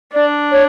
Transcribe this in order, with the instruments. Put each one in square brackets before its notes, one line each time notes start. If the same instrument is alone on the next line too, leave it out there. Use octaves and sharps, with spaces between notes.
[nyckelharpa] D4 [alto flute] D5
[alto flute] C#5